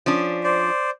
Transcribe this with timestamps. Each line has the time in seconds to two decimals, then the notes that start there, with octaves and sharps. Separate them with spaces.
0.06 F3 C#4 D4
0.44 C5 D5